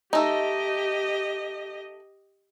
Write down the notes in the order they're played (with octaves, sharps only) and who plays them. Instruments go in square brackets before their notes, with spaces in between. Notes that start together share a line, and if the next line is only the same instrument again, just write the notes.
[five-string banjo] A3 D#4 [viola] G4 D#5